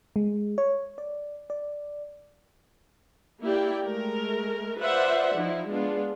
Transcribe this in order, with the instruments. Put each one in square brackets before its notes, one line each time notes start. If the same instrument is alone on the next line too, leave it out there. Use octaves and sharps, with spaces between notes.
[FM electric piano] G#3
C#5
D5
D5
[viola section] A#3 E4 G4 D5 G5
G#3 A3 A#4
F4 B4 C5 D5 E5 F#5
F3 D#4 E4
G#3 B3 D4 F4